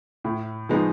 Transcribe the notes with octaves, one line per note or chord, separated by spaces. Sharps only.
A2
F3 G#3 B3 D#4